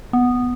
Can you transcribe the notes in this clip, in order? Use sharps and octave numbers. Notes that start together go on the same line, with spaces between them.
B3